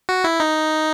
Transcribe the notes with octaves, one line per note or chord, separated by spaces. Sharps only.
F#4
E4
D#4